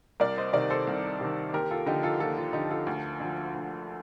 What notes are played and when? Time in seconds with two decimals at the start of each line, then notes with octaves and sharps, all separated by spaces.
0.20 C2 A#4 D5
0.38 C5 D#5
0.53 C3 D#3 A#4 D5
0.70 A4 C5
0.87 C2
1.21 C3 D#3
1.53 D#2 G4 A#4
1.71 F4 A4
1.86 D3 F3 D#4 G4
2.03 F4 A4
2.20 D#2 F4 A4
2.38 F4
2.53 D3 F3 D#4 G4
2.71 F4 A4
2.87 D2
3.20 D3 F3
3.54 D2